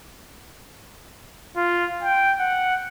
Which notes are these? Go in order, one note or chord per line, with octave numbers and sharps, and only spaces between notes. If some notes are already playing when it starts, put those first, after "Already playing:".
F4
G5
F#5